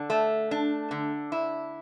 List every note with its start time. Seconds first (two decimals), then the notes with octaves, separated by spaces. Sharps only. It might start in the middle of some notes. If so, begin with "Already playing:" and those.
Already playing: D3 D4
0.10 A3
0.51 D4
0.91 D3
1.32 E4